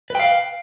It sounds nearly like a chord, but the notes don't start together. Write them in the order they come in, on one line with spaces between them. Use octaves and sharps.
B4 G5 F5